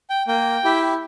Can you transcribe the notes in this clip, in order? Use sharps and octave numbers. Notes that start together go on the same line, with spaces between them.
G5
A#3 G5
E4 G4